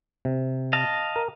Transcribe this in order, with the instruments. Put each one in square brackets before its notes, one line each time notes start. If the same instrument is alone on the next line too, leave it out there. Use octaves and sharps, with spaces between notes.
[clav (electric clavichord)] C3
[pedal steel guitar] D#5 F5 A5
[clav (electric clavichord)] A#4